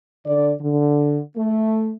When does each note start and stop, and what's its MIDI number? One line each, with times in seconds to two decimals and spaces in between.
0.26 0.52 50
0.26 0.52 74
0.60 1.18 50
1.36 1.93 57